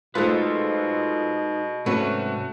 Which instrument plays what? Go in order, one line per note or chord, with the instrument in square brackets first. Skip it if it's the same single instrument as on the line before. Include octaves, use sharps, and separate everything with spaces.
[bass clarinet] B2 [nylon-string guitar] G#3 A3 [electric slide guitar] D#4 B4 [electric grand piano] F4 A4 C5
[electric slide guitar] G#2 C3 [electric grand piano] A3 F#4 [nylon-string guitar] C#4 B4